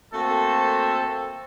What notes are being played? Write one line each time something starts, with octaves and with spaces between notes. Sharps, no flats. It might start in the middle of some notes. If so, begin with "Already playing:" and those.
A3 A#3 C4 F#4 A4